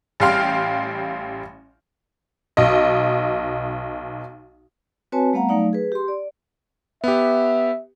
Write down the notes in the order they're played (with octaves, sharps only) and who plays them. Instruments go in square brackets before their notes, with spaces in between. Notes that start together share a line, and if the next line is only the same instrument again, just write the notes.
[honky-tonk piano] A1 G3 F5 G5 C6 F6
B1 D#5
[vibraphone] C4 F#4 B4 C#5 G#5 A5
G3 A3 B3 F5 F#5 A#5
F#3 A3 D#4 D5 F5
G#4 B4
G4 C6
D5
[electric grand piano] B3 G4 [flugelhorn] E5